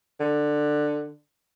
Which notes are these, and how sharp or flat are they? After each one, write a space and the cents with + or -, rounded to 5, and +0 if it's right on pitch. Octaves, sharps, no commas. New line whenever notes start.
D3 +15